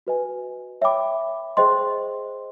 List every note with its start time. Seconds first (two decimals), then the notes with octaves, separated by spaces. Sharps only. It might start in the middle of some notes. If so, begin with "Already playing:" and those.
0.07 F#4 B4 D#5 G#5
0.81 C#5 E5 G5 B5 D6
1.57 G#4 C5 D#5 G5 C6